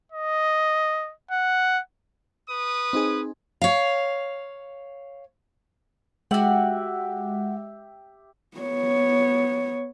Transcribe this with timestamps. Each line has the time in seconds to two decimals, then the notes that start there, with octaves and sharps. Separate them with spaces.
0.12 D#5
1.31 F#5
2.49 B4 D#6
2.93 C4 D#4 G#4
3.62 C#5 F5
6.31 G#3 F#4 G4 E5 F#5
8.57 B3 C#5